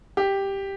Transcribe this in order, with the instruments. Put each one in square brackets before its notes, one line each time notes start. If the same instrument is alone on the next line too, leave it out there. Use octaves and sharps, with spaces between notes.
[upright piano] G4